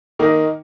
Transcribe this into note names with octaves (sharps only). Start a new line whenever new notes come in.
D#3 A#3 D#4 A#4